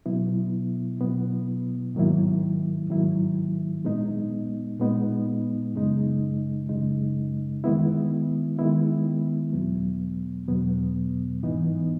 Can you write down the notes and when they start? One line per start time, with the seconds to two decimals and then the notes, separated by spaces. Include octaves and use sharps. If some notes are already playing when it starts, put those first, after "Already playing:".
0.06 B2 F#3 B3 E4
1.00 B2 F#3 B3 E4
1.95 G#2 D#3 F#3 A#3 E4
2.90 G#2 D#3 F#3 A#3 E4
3.85 A#2 G#3 B3 D#4
4.79 A#2 G#3 B3 D#4
5.74 F#2 C#3 G#3 D#4
6.69 F#2 C#3 G#3 D#4
7.64 D#3 G#3 B3 E4
8.59 D#3 G#3 B3 E4
9.53 E2 B2 F#3 B3
10.48 E2 B2 F#3 B3
11.43 G#2 E3 B3 D#4